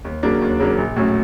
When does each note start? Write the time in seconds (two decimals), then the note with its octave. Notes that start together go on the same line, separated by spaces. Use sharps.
0.05 D#2
0.23 C#3 F#3 A#3 D4
0.42 D#2
0.60 C#3 F#3 A#3 D4
0.78 A#1
0.96 A2 F#3 A3 C#4